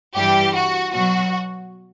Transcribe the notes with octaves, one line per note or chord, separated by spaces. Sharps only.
G2 E3 G3 G4
F#4
B2 F#3 F#4